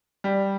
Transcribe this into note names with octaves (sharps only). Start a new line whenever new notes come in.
G3